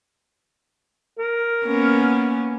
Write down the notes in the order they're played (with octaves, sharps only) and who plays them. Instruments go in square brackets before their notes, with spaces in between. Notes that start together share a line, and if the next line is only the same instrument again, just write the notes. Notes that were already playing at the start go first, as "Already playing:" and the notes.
[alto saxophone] A#4
[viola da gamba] A#3 B3 C#4